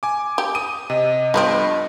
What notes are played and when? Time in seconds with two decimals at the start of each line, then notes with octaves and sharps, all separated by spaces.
0.03 G#5 D6
0.38 G4
0.55 D#6 D#7
0.90 C3 D#5
1.34 G2 F3 B3 C4